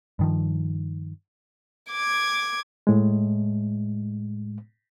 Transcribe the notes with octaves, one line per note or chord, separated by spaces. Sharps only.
G2 D#3 F3
D6 G#6
A2 G#3